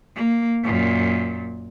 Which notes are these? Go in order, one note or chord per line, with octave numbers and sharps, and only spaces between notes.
A#3
F#2 A#2